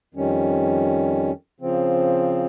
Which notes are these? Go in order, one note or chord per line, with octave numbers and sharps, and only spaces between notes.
F2 D#3 G3 C#4
C#3 F3 C4